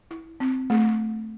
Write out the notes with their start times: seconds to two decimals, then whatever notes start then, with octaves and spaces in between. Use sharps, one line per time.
0.11 E4
0.40 C4
0.70 A3